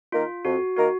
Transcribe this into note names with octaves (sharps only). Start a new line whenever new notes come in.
D#3 A#3 D#4 F4 A#4
F2 F#4
D#3 A#3 D#4 F#4 A#4